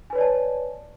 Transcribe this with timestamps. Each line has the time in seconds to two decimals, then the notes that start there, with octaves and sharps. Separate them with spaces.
0.10 G#5
0.13 B4
0.15 C#5
0.18 D5
0.21 A5